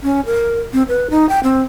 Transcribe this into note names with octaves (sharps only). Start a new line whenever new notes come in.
C#4
A#4
C4
B4
D#4
G5
C4